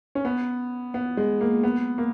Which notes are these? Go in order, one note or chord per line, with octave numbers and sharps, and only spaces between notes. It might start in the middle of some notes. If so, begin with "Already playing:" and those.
C#4
B3
B3
G#3
A#3
B3
A#3